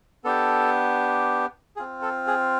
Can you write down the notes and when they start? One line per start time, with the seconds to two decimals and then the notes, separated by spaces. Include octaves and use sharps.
0.24 B3 D4 G4 A4
1.76 G#4
1.79 C4 F4
2.02 A4
2.27 G#4